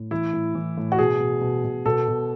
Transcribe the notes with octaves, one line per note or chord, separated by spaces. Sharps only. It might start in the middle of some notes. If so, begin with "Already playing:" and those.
Already playing: A2
E3 E4
A2
E3
A2
F#4
B2 G#4
B2
B2
B2
B2 A4
B2